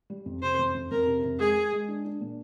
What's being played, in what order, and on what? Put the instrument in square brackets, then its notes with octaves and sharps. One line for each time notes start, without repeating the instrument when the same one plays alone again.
[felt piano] G3
F2
[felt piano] C3 [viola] C5
[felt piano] F2
F2
[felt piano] F2 [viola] A#4
[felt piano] C3
F2
[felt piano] G#3 [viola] G#4
[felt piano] G#3
G#3
D4
D4
A#2